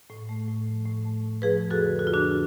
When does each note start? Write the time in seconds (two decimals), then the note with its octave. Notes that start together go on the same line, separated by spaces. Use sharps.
0.10 A2
0.29 A3
0.48 A2
0.66 F3
0.86 A2
1.05 A3
1.24 A2
1.42 F3 G#4 B4
1.62 F2
1.71 F#4 A4
1.81 D3
1.99 F2 F#4
2.07 F4
2.13 F3 D4 F#4